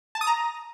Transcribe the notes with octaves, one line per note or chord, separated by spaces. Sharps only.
A5
D#6
A#5